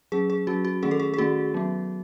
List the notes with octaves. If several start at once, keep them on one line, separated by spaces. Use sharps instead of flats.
F#3 C#4 G#4
G#4
F#3 C#4 F#4
F#4
D#3 A3 C#4 G#4
A4
G#4
G#4
D#3 A3 C#4 F#4
F#3 B3